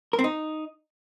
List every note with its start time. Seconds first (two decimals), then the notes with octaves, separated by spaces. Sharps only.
0.13 A#4
0.19 C4
0.24 D#4